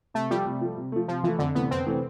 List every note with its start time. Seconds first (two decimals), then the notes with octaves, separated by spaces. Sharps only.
0.14 C3 A3
0.30 F3 G3 A3
0.46 C3
0.61 F3 A3
0.77 C3
0.92 F3 A3
1.08 C3 F3
1.24 E3 F3 A3
1.39 F2 D3
1.55 C3 E3 A3 B3
1.71 F2 C4
1.86 C3 E3 A3